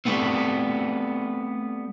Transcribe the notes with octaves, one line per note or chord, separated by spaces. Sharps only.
G3 A3 B3 C4